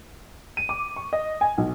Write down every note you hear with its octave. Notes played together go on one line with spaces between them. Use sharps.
D#7
D6
C#6
D#5
G#5
B1